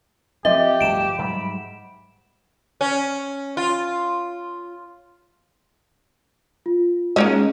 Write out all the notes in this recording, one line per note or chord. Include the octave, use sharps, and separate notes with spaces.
F3 C4 G4 D#5 E5
D1 G2 A3 D7 E7
G#2 F#3 G3 B5
C#4
F4
F4
G#3 A#3 C#4 D#4 C#5 D#5